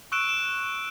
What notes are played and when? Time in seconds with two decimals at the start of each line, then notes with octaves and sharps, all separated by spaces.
0.12 C#6 E6 F#6 D7 E7
0.29 E7